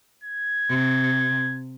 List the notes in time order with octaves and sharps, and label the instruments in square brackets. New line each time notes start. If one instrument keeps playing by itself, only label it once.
[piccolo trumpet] G#6
[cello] C3